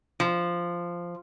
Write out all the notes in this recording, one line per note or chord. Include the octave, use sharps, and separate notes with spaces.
F3